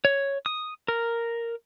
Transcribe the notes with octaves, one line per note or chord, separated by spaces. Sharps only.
C#5
D#6
A#4